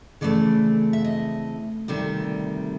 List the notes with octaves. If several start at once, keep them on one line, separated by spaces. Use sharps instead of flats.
C#3 E3 A3 C4 D5
E5
D#5
D2 C3 D#3 G3 D5